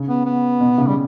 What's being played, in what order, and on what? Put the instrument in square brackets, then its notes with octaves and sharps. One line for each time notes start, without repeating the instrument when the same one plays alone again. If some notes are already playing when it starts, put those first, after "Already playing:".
Already playing: [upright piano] C#3
[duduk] B3
B3
[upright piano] B2
C#3
[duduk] G3